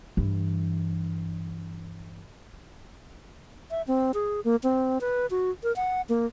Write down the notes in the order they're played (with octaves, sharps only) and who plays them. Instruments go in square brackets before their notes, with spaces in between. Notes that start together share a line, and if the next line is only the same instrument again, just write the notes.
[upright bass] G2 E3
[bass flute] E5
C4
G#4
A#3
C4
B4
F#4
A#4
F#5
A#3